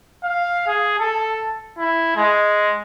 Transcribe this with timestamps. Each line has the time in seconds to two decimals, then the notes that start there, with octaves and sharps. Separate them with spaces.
0.24 F5
0.67 G#4
0.99 A4
1.78 E4
2.16 G#3